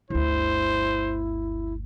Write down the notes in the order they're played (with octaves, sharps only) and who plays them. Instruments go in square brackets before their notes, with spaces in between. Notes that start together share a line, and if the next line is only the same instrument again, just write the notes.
[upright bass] G1 D2 [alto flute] E4 [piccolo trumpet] C5